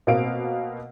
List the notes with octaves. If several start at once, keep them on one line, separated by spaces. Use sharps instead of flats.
B2 A#3 C4 F5 D7